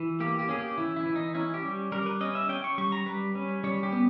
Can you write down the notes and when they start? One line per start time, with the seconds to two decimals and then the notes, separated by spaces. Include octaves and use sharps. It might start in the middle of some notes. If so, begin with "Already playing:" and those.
Already playing: E3
0.20 A#3 G4
0.39 G4
0.49 C#4 G#4
0.58 G4
0.78 E3 E4
0.96 E4
1.06 E3
1.15 D#4
1.35 C#4 E4
1.54 G4
1.64 G3
1.92 G3 A#4
2.06 B4
2.21 C#4 D#5
2.35 E5
2.49 C#4 G5
2.64 C#6
2.78 G3 C#6
2.92 A#5
3.06 G3 B4
3.35 C#4
3.64 G3 C#5
3.83 G4
3.92 B3